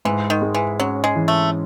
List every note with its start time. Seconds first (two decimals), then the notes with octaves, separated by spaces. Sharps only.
0.05 G#2 E3
0.30 D#3
0.42 G#3
0.55 E3
0.79 F#3 C#4
1.04 G#3
1.16 E3
1.28 A3